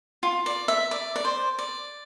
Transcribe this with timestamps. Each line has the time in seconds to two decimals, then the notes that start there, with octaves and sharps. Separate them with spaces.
0.23 F4
0.46 D5
0.68 E5
0.91 D5
1.16 D5
1.25 C5
1.59 D5